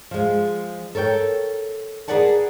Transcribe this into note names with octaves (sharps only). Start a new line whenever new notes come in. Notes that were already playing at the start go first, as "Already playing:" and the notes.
F3 G#3
A4 A#4 C#5 G5
G#4 A#4 B4 D5 F#5 A5